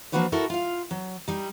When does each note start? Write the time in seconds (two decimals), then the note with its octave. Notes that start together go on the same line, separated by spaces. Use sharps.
0.12 F3 A#3 D4 F#4 B4 C#5
0.32 E4 F#4 A4 A#4
0.50 F4 F5
0.91 F#3
1.28 G3 D#4